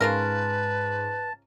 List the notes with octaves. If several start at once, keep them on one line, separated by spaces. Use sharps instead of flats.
G#2 C#3 F4 A#4 B4 A5